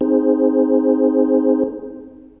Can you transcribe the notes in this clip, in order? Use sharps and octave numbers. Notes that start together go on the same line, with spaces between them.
C4 D#4 G#4 C5